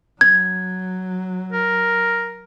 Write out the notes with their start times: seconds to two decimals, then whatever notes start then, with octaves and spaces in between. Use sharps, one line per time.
0.21 F#3 G#6
1.52 A#4